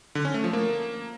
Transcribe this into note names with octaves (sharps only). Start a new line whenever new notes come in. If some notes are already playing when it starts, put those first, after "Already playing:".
D3
C#4
A3
F3
A#3